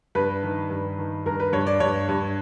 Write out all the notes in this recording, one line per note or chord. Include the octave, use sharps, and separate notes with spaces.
G2 B4
D#3
G2
D#3
G2 A#4
B4
G2 C#5
D5
G2 C#5
G2